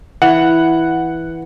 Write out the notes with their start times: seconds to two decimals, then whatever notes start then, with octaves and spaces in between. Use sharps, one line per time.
0.22 E3 F#5